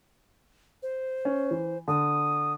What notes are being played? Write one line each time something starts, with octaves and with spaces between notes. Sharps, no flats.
C5
C#4
E3
D3 D#6